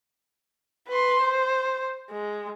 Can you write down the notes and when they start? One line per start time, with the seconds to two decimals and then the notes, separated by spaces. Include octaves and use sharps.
0.88 B4 C6
1.22 C5
2.10 G#3